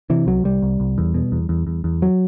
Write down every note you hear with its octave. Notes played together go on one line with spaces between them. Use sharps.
C3 E3
C2 F#3
C2 G3
C2
C2
E2
B2
E2
E2
E2
E2
F#3